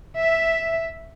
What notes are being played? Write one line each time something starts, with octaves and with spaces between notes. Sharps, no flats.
E5